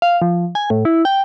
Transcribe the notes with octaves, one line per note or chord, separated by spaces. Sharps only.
F5
F3
G#5
A2
E4
G5